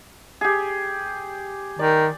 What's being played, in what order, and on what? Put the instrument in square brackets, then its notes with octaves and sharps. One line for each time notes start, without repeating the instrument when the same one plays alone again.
[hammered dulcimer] G4 G#4
[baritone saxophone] D#3 [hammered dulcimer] D5